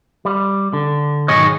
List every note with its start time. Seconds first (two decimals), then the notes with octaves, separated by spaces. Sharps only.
0.25 G3
0.73 D3
1.28 B1 G#2 D#3 G#4 C#5 D#5